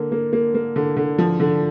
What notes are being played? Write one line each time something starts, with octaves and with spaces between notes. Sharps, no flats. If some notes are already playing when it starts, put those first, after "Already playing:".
Already playing: D3 A#3
A#3
A#3
A#3
D3
D3
F3
D3